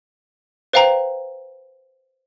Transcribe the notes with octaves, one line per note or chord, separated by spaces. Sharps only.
B4 C5 F5 G5 A#5